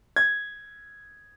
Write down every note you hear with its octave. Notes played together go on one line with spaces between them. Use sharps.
G#6